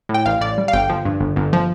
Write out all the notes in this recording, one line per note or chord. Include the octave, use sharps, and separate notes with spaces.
A2
G5
A1 F5
A1 D5
G3
F5
G1 G5
F3
G2
G1
G1
F3